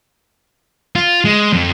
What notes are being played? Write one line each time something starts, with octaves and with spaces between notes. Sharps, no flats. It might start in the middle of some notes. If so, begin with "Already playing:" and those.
F4
G#3
F2